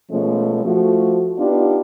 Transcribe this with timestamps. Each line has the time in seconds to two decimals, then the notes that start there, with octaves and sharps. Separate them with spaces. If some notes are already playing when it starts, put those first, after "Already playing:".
0.11 B2 F3 G#3 A3 C#4
0.64 F3 A3 F#4
1.39 B3 D4 D#4 F4 G4